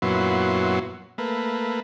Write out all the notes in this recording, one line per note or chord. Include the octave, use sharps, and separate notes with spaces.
F#2 A#2 F#3 B3 E4 C6
A3 A#3 B4